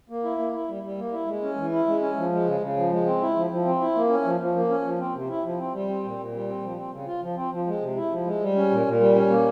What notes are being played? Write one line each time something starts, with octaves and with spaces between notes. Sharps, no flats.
A#3
E4
A#3
E4
G3
G3
A#3
E4
G#3
C#4
E3
E4
G#3
C#4
F3
G#3
C#3
C#3
F3
G#3
C4
E4
F3
F3
C4
E4
A#3
C#4
F3
F3
A#3
C#4
F3
C4
C3
E4
F3
C4
G3
C4
A#2
A#2
G3
C4
F3
C4
C#3
F4
F3
C4
F3
G#3
C3
E4
F3
G#3
G3
C#4
A#2
A#2
G3
C#4
A#3